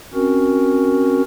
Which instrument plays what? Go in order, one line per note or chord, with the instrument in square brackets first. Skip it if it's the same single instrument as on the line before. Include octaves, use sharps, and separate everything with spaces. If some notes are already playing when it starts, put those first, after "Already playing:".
[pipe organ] C4 C#4 F#4 A#4